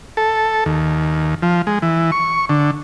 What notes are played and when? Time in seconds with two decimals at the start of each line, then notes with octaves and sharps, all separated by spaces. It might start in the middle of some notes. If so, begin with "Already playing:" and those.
0.17 A4
0.66 D#2
1.43 F3
1.67 G#3
1.82 E3
2.12 C#6
2.49 D3